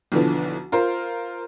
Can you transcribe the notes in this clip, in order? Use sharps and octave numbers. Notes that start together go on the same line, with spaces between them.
B1 D3 E3 F3
F4 A#4 C5